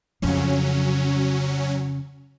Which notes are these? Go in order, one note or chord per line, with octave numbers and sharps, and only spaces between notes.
F2 C#3 F#3 C#4